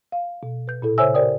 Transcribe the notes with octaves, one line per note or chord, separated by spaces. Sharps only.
F5
B2
B4 G6
A#2 E4 A4
C#3 C5 C#5 E5 G#5 E6
G4 A#4 C5 D5 G5 D#6